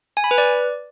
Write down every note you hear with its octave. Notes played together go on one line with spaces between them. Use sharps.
G#5
B5
B4
D5